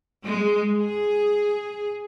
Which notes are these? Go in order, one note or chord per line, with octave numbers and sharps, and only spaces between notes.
G#3
G#4